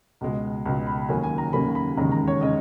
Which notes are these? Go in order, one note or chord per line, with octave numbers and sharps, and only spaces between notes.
C#2 B2 G#3
C#2 B2 G#3
B5
D#2 C#3 F#3 A#3 C#4 G#5
G#5
A#5
D#2 C#3 F#3 A#3 C#4 B5
B5
E1 D#2 C#3 G#3 C#4 A#5
A#5
C#5
C#3 G#3 C#4 D#5